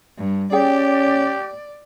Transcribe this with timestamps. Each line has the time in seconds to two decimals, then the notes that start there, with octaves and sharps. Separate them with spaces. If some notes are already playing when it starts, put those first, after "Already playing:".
0.17 G2
0.52 C#4 G4 G#4 D5 G5